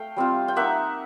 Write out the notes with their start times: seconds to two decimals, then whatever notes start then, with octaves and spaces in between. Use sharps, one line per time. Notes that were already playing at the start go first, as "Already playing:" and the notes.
Already playing: A3 F5 G5
0.17 G3 C4 F4
0.48 G5
0.56 A#3 D#4 E5 F#5